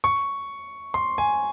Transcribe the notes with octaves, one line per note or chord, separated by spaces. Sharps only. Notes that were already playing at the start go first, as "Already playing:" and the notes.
C#6
C6
G#5